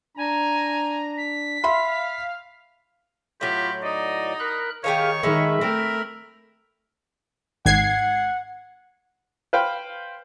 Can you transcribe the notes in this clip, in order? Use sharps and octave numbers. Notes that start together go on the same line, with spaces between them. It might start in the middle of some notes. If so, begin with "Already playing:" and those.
D4 G#5 A#5
B6
E5 F5 B5 C6
A2 F#3 F4 G4 B5
D#4 D5 D#5
A#4 B5 F#6
D#3 G4 G#4 C#5 F5
D#3 G#3 A3 E5 B5
A3 C4 A#4
G#1 F#5 G#6 C7
B4 C5 F5 G5 B5